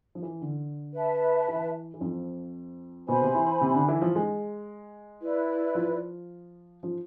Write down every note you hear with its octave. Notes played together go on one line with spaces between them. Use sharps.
F3
E3
D3
B4 E5 A5
E3
E3
F2 F3
B2 B3 C5 G#5 B5
C3 C4
E3 E4
C3 C4
E4
D3 D4
E3 E4
F3 F4
G#3 G#4
E4 B4 D5
F3 F4
F3 F4